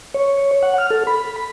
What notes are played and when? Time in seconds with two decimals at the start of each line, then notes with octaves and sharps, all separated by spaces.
0.14 C#5
0.63 F#5
0.78 F6
0.90 A4
1.07 B5